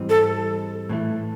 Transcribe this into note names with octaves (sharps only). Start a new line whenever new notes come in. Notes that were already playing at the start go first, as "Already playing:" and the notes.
Already playing: G#2 E3 G3 C4 D#4
A4
A2 E3 A3